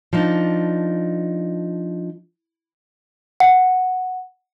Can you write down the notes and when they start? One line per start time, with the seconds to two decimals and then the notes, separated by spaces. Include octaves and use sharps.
0.13 F3 D4 D#4
3.40 F#5